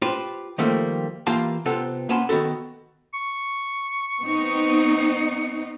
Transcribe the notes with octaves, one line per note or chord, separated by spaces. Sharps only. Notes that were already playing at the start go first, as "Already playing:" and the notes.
F4 G4 B4 C5
D#3 F3 G3 A3 A#3
E3 A#3 F4 G4 F5 A5
C3 B3 C4 F4 A4
A#3 B3 C#4 A5 B5 C6
D#3 B3 F#4 A4
C#6
B3 C4 D#4